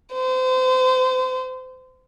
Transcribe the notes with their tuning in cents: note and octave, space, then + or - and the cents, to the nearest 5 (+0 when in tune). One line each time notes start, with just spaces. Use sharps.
C5 -30